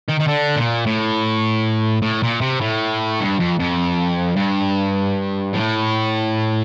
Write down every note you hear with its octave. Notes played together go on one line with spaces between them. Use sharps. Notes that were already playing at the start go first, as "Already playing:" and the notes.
D#3
D#3
D3
A#2
A2
A2
A#2
C3
A2
G2
F2
F2
G2
A2